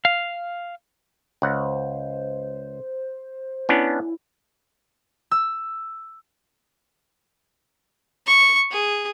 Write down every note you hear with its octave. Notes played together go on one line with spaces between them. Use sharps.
F5
C#2 C5 F#5
B3 C#4 D4 E4
E6
C#6
G#4